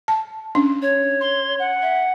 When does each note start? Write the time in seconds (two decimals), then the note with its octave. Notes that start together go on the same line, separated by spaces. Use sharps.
0.08 A5
0.55 C#4 D4
0.82 C#5
1.20 C6
1.59 F#5
1.82 E5